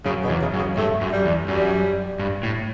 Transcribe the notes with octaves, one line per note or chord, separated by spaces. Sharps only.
F#2 C#3
B2
E2
C#3
F#2
C#3
G2 A3
F#2
G3
E2
F#2 G3
G2
A2